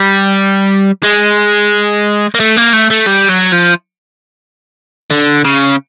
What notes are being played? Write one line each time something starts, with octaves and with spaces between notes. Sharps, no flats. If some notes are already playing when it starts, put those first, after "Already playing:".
Already playing: G3
G#3
A#3
A3
A#3
A3
A3
G3
F#3
F3
D3
C#3